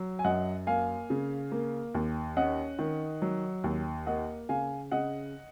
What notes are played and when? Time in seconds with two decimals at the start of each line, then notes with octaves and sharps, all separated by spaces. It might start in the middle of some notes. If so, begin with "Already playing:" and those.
Already playing: F#3
0.19 G#5
0.24 F#2 D#5 F#5
0.67 A#3 F5 G#5
1.10 C#3
1.52 A#3
1.94 D#2
2.37 C#4 D#5 F#5
2.79 D#3
3.22 F#3
3.64 D#2
4.07 A#3 D#5 F#5
4.49 C#3 F5 G#5
4.91 C#3 D#5 F#5